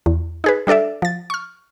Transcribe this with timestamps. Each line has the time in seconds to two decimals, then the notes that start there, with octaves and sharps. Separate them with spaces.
0.06 E2
0.44 D#4 G#4 B4
0.67 G3 D4 A4 D5 E5
1.02 F3 A6
1.30 C#6 F6